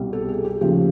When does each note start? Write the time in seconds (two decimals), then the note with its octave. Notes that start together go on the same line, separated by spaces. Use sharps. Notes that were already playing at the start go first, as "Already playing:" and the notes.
Already playing: C2 B2 G3
0.13 A4
0.29 G#4
0.44 G4
0.61 D#2 C#3 F3 A3 G4